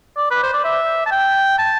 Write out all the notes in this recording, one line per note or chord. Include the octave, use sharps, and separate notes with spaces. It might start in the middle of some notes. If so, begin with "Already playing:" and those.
D5
B4
C5
D5
E5
A5
G5
A5